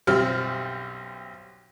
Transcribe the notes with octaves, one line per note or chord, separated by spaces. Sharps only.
B1 F#2 G3 C4 F6